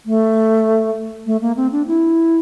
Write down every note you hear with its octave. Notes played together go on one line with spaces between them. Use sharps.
A3
A3
A#3
C4
D4
E4